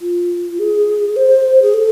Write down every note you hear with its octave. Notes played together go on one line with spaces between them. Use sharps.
F4
G#4
C5
G#4
A4